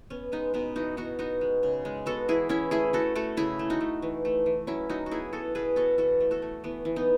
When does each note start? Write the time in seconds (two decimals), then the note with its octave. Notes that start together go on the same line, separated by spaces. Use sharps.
0.10 B3 C#4
0.32 G#3 B3 D#4
0.54 B2 B3 D#4
0.75 E3 D#4 F#4
0.97 B3 D#4 F#4
1.19 B3 D#4 F#4
1.41 G#3
1.63 C#3
1.85 G#3
2.06 B3 F#4 A4
2.28 E3 E4 G#4
2.49 E3 C#4 E4
2.71 A3 E4 G#4
2.93 A3 F#4 A4
3.15 A3 F#4 A4
3.37 C#3 E4 G#4
3.59 A3
3.70 D#4 F#4
3.81 A3
4.02 E3
4.25 A3
4.46 E3
4.67 F#3 C#4 E4
4.89 F#3 D#4 F#4
5.06 F#4
5.11 B3 E4 G#4
5.33 B3 F#4 A4
5.55 B2 G#4 B4
5.76 B3 F#4 A4
5.98 E3 F#4 A4
6.20 A3
6.31 F#4 A4
6.42 A3
6.64 E3 B3
6.85 E3
6.96 B3 D#4